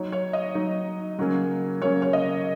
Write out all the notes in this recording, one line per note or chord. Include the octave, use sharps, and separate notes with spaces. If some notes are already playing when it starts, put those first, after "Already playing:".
Already playing: F#3 D#4 C#5
C#5
D#5
F#3 D#4
C#3 F#3 A#3 C#4
C#3 F#3 A#3 C#4 C#5
C#5
D#5